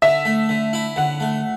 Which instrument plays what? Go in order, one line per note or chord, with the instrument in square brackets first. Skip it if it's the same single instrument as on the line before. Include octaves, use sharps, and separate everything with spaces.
[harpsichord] D3 [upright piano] E5
[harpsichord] A3
D3
E4
[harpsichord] D3 [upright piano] F#5
[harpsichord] A3